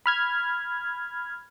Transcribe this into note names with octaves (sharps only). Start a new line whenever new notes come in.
B5 F6 G#6